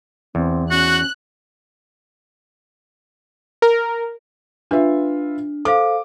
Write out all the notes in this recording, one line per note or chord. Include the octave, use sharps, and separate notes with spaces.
E2 C4
C#4 F#4 F#6
A#4
D4 F4 B4 E5
A4 C5 F5 D6